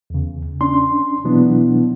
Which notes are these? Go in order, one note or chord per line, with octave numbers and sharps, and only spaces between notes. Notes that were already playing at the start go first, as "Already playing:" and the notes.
E2 C#3
C#4 D4 C6
B2 E3 F#3 B3 D4 E4